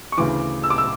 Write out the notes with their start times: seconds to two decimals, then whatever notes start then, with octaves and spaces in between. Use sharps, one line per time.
0.12 C#6
0.17 D2 C#3 E3 D6
0.64 E6
0.70 D6
0.78 E6